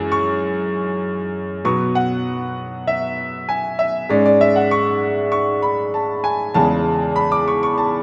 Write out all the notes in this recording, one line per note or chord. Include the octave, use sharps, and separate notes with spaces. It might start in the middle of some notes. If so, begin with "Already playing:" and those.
Already playing: F#2 E3 G#3 C#4
C#6
B2 F#3 B3 C#6
F#5
E5
G#5
E5
G#2 G#3 C#4 D5
D5
E5
F#5
C#6
C#6
B5
A5
G#5
E2 C#3 G#3 A5
B5
D6
C#6
C#6
A5